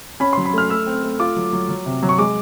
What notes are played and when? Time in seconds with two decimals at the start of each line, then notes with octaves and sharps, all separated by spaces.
0.20 C#4 B5
0.33 F#3 C6
0.45 B5
0.53 A3 F6
0.70 A3 E6
0.87 C4
1.03 A3
1.20 F4 D6
1.36 F#3
1.53 F#3
1.69 F#3
1.86 C3
2.03 F#3
2.09 C#6
2.18 G#3 D6